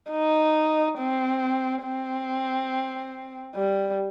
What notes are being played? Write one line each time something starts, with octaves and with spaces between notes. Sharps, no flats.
D#4
C4
C4
G3